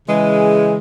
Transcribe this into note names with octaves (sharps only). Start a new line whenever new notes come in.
C#3 E3 G#3